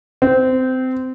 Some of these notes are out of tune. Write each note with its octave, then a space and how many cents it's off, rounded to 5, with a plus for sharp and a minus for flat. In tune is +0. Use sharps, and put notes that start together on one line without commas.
C4 -20